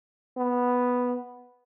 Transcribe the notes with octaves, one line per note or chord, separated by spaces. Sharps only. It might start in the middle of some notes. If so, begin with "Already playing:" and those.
B3